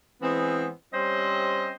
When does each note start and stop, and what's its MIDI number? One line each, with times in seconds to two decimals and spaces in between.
0.22 0.68 52
0.22 0.68 56
0.22 0.68 59
0.22 0.68 60
0.93 1.71 55
0.93 1.71 60
0.93 1.71 61
0.93 1.71 72
0.93 1.71 75